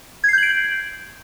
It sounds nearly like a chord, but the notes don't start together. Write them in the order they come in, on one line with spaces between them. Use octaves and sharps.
G#6 C7 G6 F#7 D7